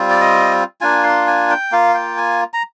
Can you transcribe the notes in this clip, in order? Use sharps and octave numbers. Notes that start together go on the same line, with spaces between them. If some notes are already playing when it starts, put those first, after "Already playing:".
Already playing: G3 C4 F4
D5
D#5
A#3 D4 F4 G#5
C6
G#5
G5
A#3 F4 F5
G5
G#5
A#5